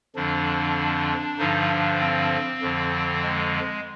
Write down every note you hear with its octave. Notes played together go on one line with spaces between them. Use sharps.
F2 D3 F3 D4
G2 D3 F3 D#4
D4
C4
F2 D3 F3
G#3